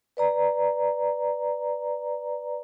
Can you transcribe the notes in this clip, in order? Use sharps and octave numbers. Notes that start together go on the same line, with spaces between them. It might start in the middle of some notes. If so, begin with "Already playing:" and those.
B4 D5 A#5